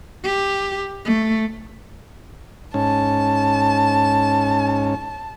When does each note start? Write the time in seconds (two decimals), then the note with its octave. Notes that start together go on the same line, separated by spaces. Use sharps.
0.24 G4
1.05 A3
2.74 G#2 C#4 A5